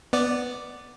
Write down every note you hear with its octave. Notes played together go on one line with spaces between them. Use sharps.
B3 D5